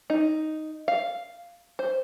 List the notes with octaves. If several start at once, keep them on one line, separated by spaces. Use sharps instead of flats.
D#4
F5
C5